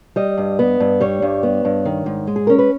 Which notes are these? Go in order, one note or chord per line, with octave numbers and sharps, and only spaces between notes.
G3 D#5
G2
B3
G2
G3 C#5
G2
B3
G2
D#3
G#2
G#3
G#4
C#4 A#4
B4